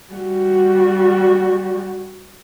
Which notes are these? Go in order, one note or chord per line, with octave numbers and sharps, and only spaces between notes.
G3 F#4